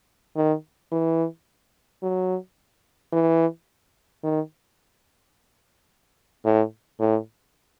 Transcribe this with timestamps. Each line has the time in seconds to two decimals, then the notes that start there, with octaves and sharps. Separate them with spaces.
0.36 D#3
0.92 E3
2.02 F#3
3.13 E3
4.23 D#3
6.45 A2
6.99 A2